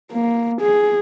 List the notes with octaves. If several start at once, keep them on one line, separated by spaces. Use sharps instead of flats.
A#3
G#4